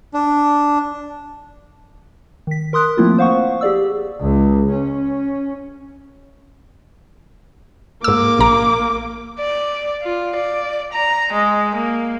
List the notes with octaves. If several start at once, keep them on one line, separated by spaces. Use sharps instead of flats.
D4
D#3 B6
A#4 C6 D#6 F#6
F3 A3 A#3 C4 E4 F4
C5 F5 F#5 C#6
G4 G#4 D5 E6
C#2
C#4
G#2 A#3 D6 E6
A#1 A#5
D5
F4
D5
A#5
G#3
A#3